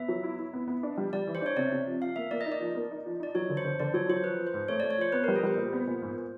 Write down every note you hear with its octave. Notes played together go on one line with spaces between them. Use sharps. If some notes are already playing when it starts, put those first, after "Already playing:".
Already playing: B3 E5
F#3
E4
E4
B3
B3
D4
G3
G3 D5
E3
C5
D4 C#5
C3 D5
C3
F3
F3 F5
A#3 E5
A#3 D5
D#5
D#4
D5
F3
A#3
D#4
F3
D#4 D5
F#3 C#5
D3
C5
D3
D3 D5
F#3 C#5
F#3 C5
F3 B4
F3
C5
G#2
A3 C#5
A3 D5
C#5
F3 C5
B3 B4
G3 A#4
G#4
G3 C5
A#2
B3
A#2
G#2